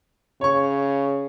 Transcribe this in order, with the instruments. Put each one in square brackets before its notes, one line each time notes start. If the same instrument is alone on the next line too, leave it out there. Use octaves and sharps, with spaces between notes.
[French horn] C#3 [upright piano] C#5 C#6